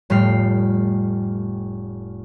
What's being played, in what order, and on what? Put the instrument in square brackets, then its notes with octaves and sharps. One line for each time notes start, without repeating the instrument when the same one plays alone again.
[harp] F1 A2 G3 G5 F6 C7